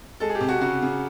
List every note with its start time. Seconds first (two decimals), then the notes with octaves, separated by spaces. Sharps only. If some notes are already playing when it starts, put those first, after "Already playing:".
0.20 G#3 A4
0.29 G#4
0.35 G4
0.41 C3
0.49 F#4
0.61 C#3 F#4
0.82 C#3